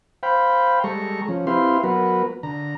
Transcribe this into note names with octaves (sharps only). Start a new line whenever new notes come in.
C5 F5 G5 B5
G3 G#3 A4 A#5 C#6
F3 C#4
C4 E4 G4 B4 F5 C6
F#3 B3 F#4 A#4 B4
D3 A#5